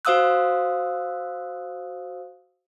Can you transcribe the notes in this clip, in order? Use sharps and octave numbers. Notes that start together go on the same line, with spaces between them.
F#4 C5 F5 D#6 E6 F#6